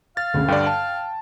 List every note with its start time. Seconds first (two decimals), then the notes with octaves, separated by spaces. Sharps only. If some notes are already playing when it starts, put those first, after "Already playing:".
0.17 F5 A6
0.34 D2 C#3
0.48 G2 D3 D5 G5
0.67 A5